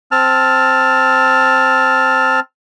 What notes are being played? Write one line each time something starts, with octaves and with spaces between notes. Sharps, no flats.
C4 A5 F6